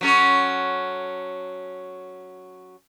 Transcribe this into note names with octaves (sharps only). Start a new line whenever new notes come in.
F#3 C#4 A4